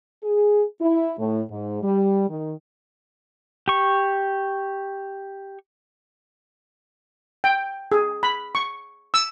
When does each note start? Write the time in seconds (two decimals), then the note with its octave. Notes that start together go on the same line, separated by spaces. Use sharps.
0.24 G#4
0.80 E4
1.19 A2
1.50 G#2
1.82 G3
2.29 D#3
3.68 G4 C#6
7.44 G5
7.92 G#4
8.23 B5
8.55 C#6
9.14 E6